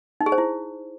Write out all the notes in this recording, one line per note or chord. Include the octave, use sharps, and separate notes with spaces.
D#4
G#4
C5
E4